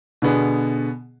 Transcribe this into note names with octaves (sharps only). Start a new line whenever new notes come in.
B2 D3 B3 G#4